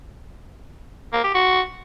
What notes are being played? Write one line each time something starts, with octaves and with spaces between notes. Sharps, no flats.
A#3
G4
F#4